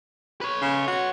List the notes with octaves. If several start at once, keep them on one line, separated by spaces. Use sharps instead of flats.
B4 C#5
C#3
F#4